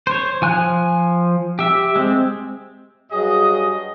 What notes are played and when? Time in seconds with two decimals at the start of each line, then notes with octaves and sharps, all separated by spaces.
0.07 C5 C#5
0.42 F3 G#5 F#6
1.59 G4 E5
1.96 G#3 C4
3.11 G2 F#3 G#4 D#5